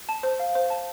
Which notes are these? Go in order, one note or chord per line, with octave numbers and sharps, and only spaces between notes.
A5
C5
F5
C5
A5